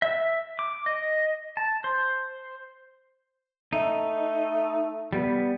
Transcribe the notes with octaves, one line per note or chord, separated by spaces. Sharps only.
E5
D6
D#5
A5
C5
A3 D#4
G3 B3